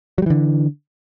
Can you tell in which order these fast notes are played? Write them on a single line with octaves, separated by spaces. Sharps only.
F#3 G3 E3 D3